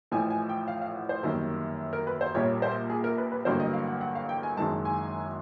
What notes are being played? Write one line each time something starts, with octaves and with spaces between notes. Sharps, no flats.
A1 A2 F3 G#5
G#5
G5
F5
F5
F#5
C5
G1 F#2 D#3 G3 A#3
A#4
B4
C5
A#1 A#2 G3 A#3 C#5
C5
G#4
A#4
B4
B4
A1 G2 D3 F#3 A#3 C5
D#5
F5
F#5
F#5
F5
G5
G#5
F#1 F#2 D#3 G#3 A5
G#5